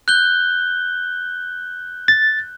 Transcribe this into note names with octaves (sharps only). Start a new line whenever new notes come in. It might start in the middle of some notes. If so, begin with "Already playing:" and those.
F#6 G6 G7
A6